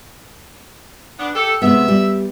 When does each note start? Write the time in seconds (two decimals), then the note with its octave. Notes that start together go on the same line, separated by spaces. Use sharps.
1.18 B3 D4
1.35 G4 A4
1.62 C3 G#3 B3 E5
1.88 G3